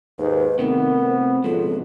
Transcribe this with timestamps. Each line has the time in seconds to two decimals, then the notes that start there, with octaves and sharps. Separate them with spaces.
0.19 D#2 G#2 B4
0.59 C3 D#3 A3 B3 A#4
1.03 C4
1.44 C#2 G#2 B2 F3 A4